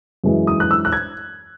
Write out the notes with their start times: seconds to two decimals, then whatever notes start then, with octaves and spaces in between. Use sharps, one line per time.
0.24 F#2 E3 G#3
0.47 D#6
0.60 F#6
0.71 E6
0.85 F#6
0.92 G#6